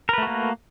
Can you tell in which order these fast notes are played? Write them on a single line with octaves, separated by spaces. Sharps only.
A#4 B4 A3 F#4 A#3